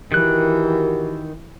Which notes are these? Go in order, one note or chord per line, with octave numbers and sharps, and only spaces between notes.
D#3 E3 F#4 G4 A#4 F#6